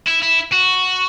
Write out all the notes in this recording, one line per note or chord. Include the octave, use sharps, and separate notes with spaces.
E4
E4
F#4